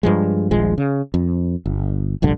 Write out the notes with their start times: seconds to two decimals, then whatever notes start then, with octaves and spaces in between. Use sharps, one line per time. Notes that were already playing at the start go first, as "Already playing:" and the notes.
0.03 G2 F3 G#3
0.51 D#1 A#1 F3 G#3
0.78 C#3
1.14 F2
1.66 G1
2.22 F1 A#1 G2 D3